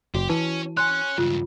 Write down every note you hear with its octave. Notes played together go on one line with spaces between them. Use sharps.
F#1 F#4 G4
E3 C#4 A5
C#5 G#5 C6 F#6
C#2 G2 F4